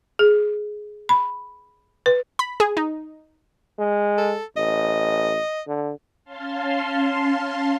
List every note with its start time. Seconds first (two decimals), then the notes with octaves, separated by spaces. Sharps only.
0.19 G#4
1.09 B5
2.06 B4
2.39 B5
2.60 G#4
2.77 D#4
3.79 G#3
4.18 A4
4.57 A1 D#5
5.67 D3
6.25 C#4 F5 A5 C6